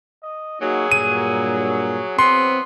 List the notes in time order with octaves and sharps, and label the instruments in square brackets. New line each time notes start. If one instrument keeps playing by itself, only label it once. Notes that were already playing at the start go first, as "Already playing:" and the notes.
[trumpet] D#5
[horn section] F#3 [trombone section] A#3 D#4 F#4 [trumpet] G#4
[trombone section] G2 A#2 [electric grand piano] D#7
[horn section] E3 F#3 B3 [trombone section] C4 [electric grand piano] C6